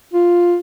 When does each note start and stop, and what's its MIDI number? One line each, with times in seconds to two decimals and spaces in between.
0.13 0.57 65